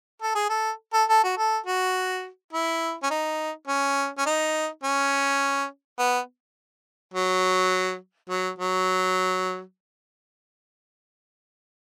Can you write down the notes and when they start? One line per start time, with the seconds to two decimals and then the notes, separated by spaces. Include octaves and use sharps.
0.22 A4
0.35 G#4
0.49 A4
0.94 A4
1.09 A4
1.23 F#4
1.38 A4
1.66 F#4
2.53 E4
3.03 C#4
3.11 D#4
3.68 C#4
4.18 C#4
4.26 D#4
4.84 C#4
5.99 B3
7.14 F#3
8.29 F#3
8.59 F#3